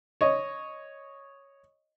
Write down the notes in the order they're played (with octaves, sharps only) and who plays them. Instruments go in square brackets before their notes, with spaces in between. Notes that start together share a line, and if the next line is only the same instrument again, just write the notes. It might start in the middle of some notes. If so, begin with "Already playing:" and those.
[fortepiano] C#5 D#5